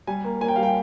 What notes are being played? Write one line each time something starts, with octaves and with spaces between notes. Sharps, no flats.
G3 G#5
A#3
A#3 G#5
G5
G3 F5
G5